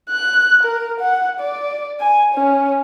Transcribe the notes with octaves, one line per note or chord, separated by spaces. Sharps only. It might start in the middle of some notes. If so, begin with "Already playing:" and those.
F#6
A#4
F#5
D5
G#5
C#4